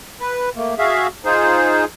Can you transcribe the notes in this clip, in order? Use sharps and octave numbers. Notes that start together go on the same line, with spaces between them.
B4
A3 A#3
F#4 G#4 E5 F5
D#4 F4 G#4 C5